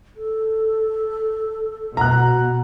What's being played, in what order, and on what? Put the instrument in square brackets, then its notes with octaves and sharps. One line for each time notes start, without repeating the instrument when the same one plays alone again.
[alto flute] A4
[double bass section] B2 [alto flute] F#5 [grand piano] A#5 F#6